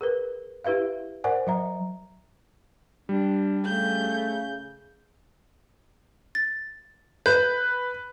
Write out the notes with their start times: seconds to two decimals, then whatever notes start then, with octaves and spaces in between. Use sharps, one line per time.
0.01 G#4 A#4 B4
0.64 E4 G4 B4 E5 F5
1.24 A#4 C5 D5 F#5 G#5
1.47 F#3 E5 A#5
3.09 G3 D4
3.65 C#3 A3 G6
6.35 A6
7.26 B4 G6